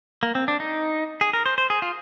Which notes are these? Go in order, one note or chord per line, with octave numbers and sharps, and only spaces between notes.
A#3
C4
D4
D#4
G#4
A#4
C5
C5
G#4
F4